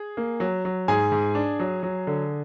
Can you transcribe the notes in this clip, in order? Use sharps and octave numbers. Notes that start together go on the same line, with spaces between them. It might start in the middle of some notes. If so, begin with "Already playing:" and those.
Already playing: G#4
A#3
F#3
F#3
G#2 G#4 G#5
G#2
D4
F#3
F#3
D3